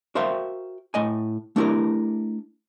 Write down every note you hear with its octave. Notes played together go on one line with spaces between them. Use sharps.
F#4 A#4 C5 E5 F5 G5
A2 D#5 G#5
A3 D4 E4 G4 A#4